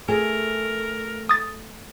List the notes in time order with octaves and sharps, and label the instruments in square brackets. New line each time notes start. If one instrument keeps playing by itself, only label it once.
[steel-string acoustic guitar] A3 [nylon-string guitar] G#4 [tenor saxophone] A#4
[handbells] D#6 A6